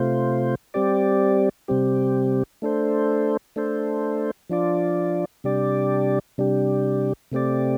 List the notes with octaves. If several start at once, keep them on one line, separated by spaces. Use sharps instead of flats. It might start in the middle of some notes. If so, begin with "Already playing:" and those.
Already playing: C3 A3 F4 C5
G3 C4 G4 D5
C3 G3 C4 G4
A3 D4 A4 C5
A3 D4 A4 C5
F3 D4 F4 D5
C3 G3 D4 G4 D5
C3 G3 D4 G4
C3 A3 C4 G4 D5